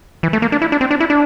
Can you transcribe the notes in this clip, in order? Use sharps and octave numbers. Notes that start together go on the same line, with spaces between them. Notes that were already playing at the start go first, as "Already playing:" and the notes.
E3
A3
A#3
D4
E4
D4
C4
D4
E4
D4